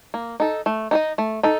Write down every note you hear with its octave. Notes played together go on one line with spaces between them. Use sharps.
A#3
D#4 A4
A3
D#4 A4 D#5
A3
D#4 A4